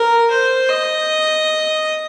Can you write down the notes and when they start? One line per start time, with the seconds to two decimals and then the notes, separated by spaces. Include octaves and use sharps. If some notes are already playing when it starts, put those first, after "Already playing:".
Already playing: A#4
0.31 C5
0.69 D#5